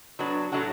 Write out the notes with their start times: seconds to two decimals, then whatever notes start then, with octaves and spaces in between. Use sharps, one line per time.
0.19 F#3 B3 D4
0.52 A2 F#3 A3 D4 F#4